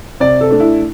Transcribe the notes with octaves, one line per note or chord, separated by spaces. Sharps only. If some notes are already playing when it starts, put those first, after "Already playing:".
C3 D5
A4
A3 D4
E4